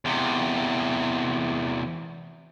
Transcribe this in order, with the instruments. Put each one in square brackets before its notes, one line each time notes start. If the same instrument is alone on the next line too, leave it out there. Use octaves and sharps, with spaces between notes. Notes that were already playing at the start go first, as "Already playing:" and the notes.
[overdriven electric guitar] E2 C3